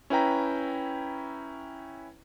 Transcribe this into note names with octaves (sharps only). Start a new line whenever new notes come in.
C#4 E4 B4 G5 A#5